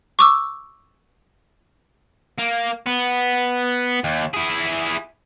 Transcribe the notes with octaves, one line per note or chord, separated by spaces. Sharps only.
C#6 D6 E6
A#3
B3
D#2
E4 G#4